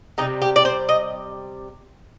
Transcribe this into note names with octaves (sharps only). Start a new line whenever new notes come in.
C3 D#3 G3 D#4
G4
D5
C5
D#5